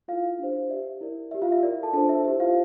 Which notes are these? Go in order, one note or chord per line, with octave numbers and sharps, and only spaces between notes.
E4 F4 A4 D5 F5
D4 G4 C5
G4 D5 E5
E4 A#4 D5
G4 D5 E5
F4 F5
E5
E4 A#4 D5
A4 A5
D4 F4 A4 C5 A5
E5
E4 G4 C5 E5
F4 F5